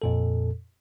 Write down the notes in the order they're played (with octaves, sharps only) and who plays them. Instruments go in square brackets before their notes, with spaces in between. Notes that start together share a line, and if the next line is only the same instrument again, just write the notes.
[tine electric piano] F2 A#2 A4